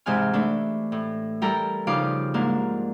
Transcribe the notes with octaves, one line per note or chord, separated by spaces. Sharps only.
G#2 C3 E3 G#5 F6
E3 A3 D4
A2
G3 E4 A4 A#4 G5 A#5
C#3 F3 G3 D#4 F5 D6
G#2 A#3 D4 A#4